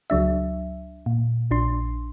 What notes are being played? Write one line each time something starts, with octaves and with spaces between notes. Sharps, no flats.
C#2 F#3 D4 E5
A#2
A#1 D4 C6